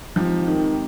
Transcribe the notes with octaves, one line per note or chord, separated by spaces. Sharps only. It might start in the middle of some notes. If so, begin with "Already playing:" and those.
F3 G#3 C4 D#4 G4
D#3